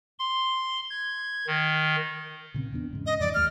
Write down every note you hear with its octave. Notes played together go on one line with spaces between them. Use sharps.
C6
G#6
D#3
A#2 C#3 C4
E2 B3 D4
E2 G#2 C#3
D#5
F2 G#2 E3 D5
D#2 G#3 F6